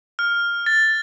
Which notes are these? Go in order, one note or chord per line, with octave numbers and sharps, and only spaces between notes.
F6
A6